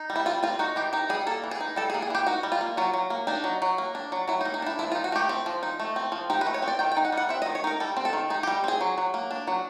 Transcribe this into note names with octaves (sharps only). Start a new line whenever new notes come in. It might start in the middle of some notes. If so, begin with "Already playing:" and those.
Already playing: D#4
G3
E4
G3 F4
C4 F4
D#4 F#4
E3 G4
D#4 G4
G3 G#4
A#3 A4
E3
G#4
D#4
G3 A4
G#4
A#3
G#4
E3 G4
D#4 F#4
G3
F4
A#3
F#3 F4
F#3
A#3
D4 D#4
F#3
F#3
A#3
D4
F#3
F#3 E4
D#4
A#3
D#4
D4 E4
F3 E4
F4
D#4
F#4
A3 G4
C4
F3
D#4
A3
C4
F3
D#4 G4
B4
A3
C#5
C4
D5
D#3 G5
G5
D#4
F#5
G3
F#5
C4 E5
D#5
D#3
C#5
D#4 A#4
G3 A4
C4
A4
D#3
D#4 G#4
G4
G3
C4 G#4
F#3
F#3
A#3
D4
F#3